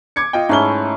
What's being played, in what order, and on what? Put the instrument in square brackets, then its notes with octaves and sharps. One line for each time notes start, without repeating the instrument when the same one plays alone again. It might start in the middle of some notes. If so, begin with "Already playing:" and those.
[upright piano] D6 G#6 C#7
F4 D#5 G5
[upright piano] G#2 G7 [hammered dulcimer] A3 C#4 E4